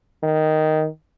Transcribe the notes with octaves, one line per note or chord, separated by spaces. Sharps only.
D#3